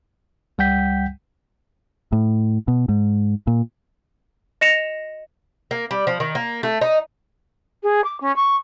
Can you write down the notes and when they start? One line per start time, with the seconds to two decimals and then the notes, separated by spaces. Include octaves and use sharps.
0.58 C#2 G3 F#5 G5 G6 B6
2.12 A2
2.68 B2
2.89 G#2
3.47 A#2
4.61 D#5 A#6 C#7 E7 F7
5.71 A#3
5.91 G3
6.07 F3
6.20 D#3
6.35 A#3
6.63 A3
6.81 D#4
7.83 G#4
8.04 D6
8.21 C#4
8.36 C#6